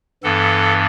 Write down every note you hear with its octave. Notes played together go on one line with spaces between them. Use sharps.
G2 E3 B3 A4